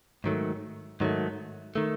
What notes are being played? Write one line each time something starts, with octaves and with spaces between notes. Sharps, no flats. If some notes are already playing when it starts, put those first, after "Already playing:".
G#2 D#3 F#3 A3
G#2 D#3 F#3 A3
D#3 A3